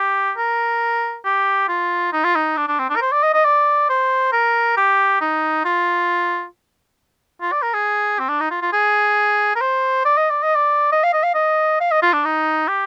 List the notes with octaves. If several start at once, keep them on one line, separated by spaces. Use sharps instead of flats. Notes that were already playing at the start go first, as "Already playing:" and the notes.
Already playing: G4
A#4
G4
F4
D#4
F4
D#4
D4
D4
C4
D4
A#4
C5
D5
D#5
D#5
D5
C5
A#4
G4
D#4
F4
F4
D5
A#4
G#4
C4
D4
D#4
F4
F4
G#4
A#4
C5
D5
D#5
D5
D#5
D5
D#5
F5
D#5
F5
D#5
F5
D#5
F4
D4
D#4
G4